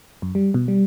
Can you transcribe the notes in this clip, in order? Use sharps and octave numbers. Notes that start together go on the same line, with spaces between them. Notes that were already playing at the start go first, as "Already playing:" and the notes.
F#2
G3
B2
G3